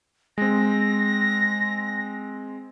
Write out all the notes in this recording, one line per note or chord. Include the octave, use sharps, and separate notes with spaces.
G#3 C4 A#6